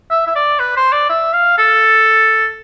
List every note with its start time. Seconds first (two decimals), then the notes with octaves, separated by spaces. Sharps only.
0.11 E5
0.27 E5
0.36 D5
0.59 B4
0.77 C5
0.92 D5
1.10 E5
1.33 F5
1.58 A4